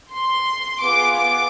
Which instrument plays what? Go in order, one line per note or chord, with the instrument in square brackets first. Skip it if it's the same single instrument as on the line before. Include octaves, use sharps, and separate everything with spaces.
[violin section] C6
B3 F4 G#4 D6
D6